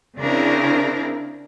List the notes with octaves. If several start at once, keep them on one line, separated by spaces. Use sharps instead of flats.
C#3 C4 D4 E4 A#4